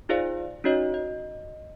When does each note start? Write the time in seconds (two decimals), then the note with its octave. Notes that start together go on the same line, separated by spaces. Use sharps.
0.09 D#4 F4 G#4 C5 D5 F5
0.64 C#4 D#4 F#4 C#5 D#5
0.94 D#5